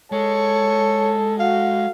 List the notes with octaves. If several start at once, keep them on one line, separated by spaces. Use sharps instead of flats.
G#3 A4 C#5
F#4 F5